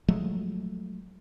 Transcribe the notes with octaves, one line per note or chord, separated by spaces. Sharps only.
F3 F#3 G#3 A3